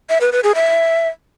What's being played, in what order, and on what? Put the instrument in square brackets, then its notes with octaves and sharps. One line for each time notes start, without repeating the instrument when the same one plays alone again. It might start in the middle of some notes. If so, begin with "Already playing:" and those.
[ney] E5
B4
B4
G#4
E5